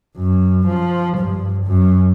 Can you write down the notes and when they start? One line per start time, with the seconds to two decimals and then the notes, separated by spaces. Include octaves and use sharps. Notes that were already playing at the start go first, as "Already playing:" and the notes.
0.18 F#2
0.66 F3
1.18 G2
1.66 F#2